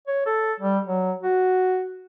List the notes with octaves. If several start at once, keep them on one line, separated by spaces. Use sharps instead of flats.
C#5
A4
G3
F#3
F#4